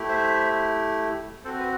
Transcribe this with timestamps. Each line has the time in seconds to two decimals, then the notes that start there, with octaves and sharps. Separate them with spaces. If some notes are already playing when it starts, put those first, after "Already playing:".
Already playing: A3 E4 G4
0.09 C5 E5
1.45 C4 F#4 A4 C5
1.59 B4